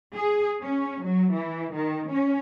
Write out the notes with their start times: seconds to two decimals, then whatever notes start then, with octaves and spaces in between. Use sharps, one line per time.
0.15 G#4
0.63 C#4
1.04 F#3
1.34 E3
1.74 D#3
2.11 C#4